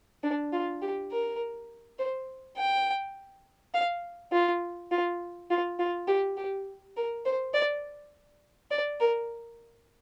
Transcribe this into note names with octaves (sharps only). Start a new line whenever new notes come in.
D4
F4
G4
A#4
C5
G5
F5
F4
F4
F4
F4
G4
G4
A#4
C5
D5
D5
A#4